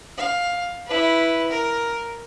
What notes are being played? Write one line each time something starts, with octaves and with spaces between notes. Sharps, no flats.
F5
E4 B4
A#4